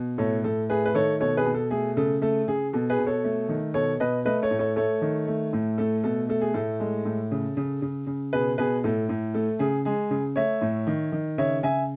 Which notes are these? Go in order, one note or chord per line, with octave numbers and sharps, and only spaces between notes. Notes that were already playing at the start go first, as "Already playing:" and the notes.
Already playing: B2
A2 A4 C#5
A2 A4
A3 G#4 B4
B4
D#3 A4 C#5
B2 A4 C#5
G#4 B4
B2
A4
A3 G#4
C#3 A4
A3 A4
C#3 G#4
B2 A4
G#4 B4
B2
A4 C#5
A3
D#3
B2 A4 C#5
B2 B4 D#5
A3 B4 D#5
A4 C#5
A2
A4 C#5
A3 A4 C#5
D#3
A3
A2
A3 A4
B2 A4
A3 A4
G#4
A2 A4
G#3
A2
C#3
C#3
C#3
C#3
B2 G#4 B4
B2 G#4 B4
A2 A4
A2
A3 A4
C#3 G#4
G#3 G#4
C#3
A3 C#5 E5
A2
D#3
D#3
C#3 C#5 E5
C#3 E5 G#5